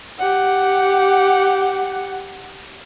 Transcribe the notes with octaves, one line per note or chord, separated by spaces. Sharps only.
G4 F#5